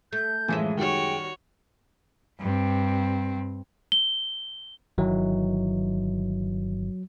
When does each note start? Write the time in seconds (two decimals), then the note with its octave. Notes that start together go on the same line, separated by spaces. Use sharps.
0.13 A3 G6
0.48 F#2 A2 E3 F3 G#3 E5
0.77 D#3 G3 F#4 C#5 G5
2.40 G2 C4
3.92 G7
4.98 G1 D#3 E3 F#3